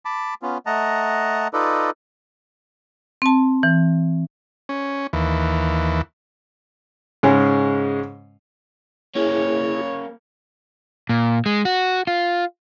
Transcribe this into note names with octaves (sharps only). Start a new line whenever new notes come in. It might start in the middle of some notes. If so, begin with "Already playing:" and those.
A5 B5 D6
B3 C#4 F4
A3 D#5 F#5 A5 A#5
D#4 F4 A4 B4 D5 D#5
C4 A5
E3
C#4
D#2 E3
G#2 C#3 G#3 C#4
A#3 C#4 E4 G#4 C#5
A#2
G#3
F#4
F4